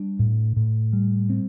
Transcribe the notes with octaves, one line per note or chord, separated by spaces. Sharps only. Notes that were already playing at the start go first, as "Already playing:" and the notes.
Already playing: G3 D4
A2
A2
G3
C4